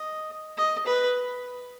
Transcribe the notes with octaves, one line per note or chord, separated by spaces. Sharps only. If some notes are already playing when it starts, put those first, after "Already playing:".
Already playing: D#5
D#5
B4